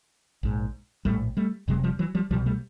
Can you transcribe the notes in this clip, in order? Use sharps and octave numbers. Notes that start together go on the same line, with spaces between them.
A#1 G#2
A#1 A2 G3 A3
G3 A3
F1 F2 C3 F#3 G#3
F3 G3
E3 F#3
F3 G3
C2 B2 F3 G3
G3 A3